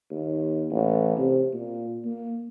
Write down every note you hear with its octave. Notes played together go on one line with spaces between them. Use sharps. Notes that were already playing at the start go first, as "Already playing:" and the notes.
D#2
A1
C3
A#2
A#3